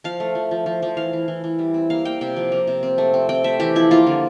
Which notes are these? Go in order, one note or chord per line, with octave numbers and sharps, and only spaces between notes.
F3 F5
A3
F3
F3
F3
F3
E3 F5
E3
E3
E3
G3
C4
A#3 F5
A#3 G5
C3 G5
F3
A#3
C3
C4
A3
C4
C4 G5
A3 E5
E3 G4
F3 E4
A#3 F4
D3